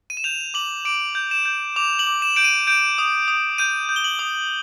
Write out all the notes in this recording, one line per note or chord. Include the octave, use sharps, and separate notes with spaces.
D#7
E7
G6 F7
D6 F#7
D6 D7
G6
E7
G6
D6 F7
F#7
D6
E7
G6 D7
D#7
G6 D7
D#6
D#6
G6 D#7
G6
G7
F#7
D#6